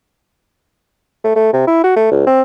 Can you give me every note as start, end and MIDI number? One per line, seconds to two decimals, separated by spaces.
1.24 1.33 57
1.36 1.51 57
1.53 1.62 48
1.67 1.82 64
1.84 1.94 66
1.96 2.09 57
2.11 2.24 37
2.27 2.42 60